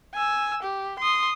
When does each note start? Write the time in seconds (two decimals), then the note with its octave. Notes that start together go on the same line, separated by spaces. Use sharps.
0.14 G#5 E6
0.63 G4
0.99 C6 D#6